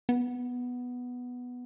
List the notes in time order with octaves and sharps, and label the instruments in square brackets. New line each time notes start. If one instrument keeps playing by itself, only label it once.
[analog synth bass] B3